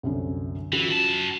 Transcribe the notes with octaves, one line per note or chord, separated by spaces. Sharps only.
C2 F#2 D3
E3 C#4 F4 F#4
F#2 A5